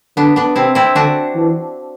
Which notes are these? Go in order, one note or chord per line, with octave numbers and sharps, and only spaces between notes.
D3 B3 D4
B3 D4
C3 C4 E4
C4 E4
D3 D4 F#4
E3